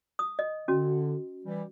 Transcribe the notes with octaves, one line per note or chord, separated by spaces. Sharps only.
D#6
D#5
D3 C#4 F#4
E3 G3